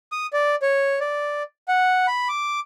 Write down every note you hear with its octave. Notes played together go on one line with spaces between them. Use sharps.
D#6
D5
C#5
D5
F#5
B5
D6